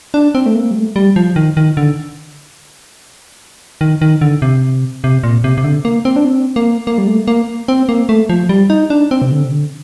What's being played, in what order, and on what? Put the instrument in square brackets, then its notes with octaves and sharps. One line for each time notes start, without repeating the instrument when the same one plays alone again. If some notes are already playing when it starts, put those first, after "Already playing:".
[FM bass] D4
C4
A3
A#3
G3
A3
G3
F3
D#3
D#3
D3
D#3
D#3
D3
C3
C3
A#2
C3
C3
D3
A#3
C4
D4
C4
A#3
A#3
G3
A3
A#3
C4
A#3
A3
F3
G3
D#4
D4
C4
C3
D3
C3
D3